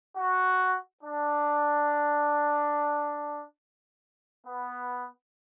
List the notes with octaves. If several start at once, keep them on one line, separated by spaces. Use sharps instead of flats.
F#4
D4
B3